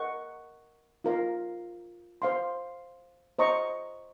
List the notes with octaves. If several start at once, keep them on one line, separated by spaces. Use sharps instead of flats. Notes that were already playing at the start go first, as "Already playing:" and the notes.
Already playing: A#4 D#5 F#5 C#6
F4 A#4 F5
C5 F5 C6
C5 D#5 A#5 C#6